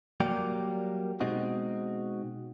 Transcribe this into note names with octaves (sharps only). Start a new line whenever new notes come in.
F#3 G3 A#3 G4 A#4 D5
B2 G#3 C4 D#4 F#4